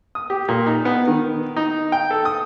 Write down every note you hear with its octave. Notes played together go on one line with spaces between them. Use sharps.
D#6
G4
A#2
D#4
B3
D#3
D#4
G5
A4
D#6